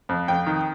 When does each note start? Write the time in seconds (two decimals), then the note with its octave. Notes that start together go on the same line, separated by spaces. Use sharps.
0.09 F2
0.28 F2 G5
0.46 D#3